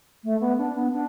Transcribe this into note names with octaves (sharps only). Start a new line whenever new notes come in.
A3
B3
D4
B3
D4